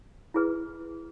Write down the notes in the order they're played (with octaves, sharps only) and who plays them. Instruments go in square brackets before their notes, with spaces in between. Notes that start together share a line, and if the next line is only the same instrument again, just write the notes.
[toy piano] E4 G#4 B4